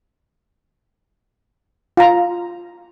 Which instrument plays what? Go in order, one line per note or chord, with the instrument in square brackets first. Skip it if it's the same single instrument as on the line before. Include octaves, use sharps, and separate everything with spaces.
[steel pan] F4 A#5